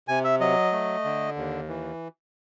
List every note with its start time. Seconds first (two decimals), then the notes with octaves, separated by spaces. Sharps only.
0.08 C3 G#5
0.24 E5
0.40 F#3 D#5
0.72 A3
1.04 D3
1.36 D#2
1.68 E3